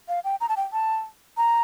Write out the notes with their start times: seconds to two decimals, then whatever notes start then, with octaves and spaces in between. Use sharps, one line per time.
0.08 F5
0.24 G5
0.41 A#5
0.49 A5
0.57 G5
0.73 A5
1.37 A#5